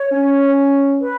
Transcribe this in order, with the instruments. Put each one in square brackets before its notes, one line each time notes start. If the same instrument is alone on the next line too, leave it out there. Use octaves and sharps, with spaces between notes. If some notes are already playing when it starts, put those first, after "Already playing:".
Already playing: [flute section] C#5
[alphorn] C#4
[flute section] B4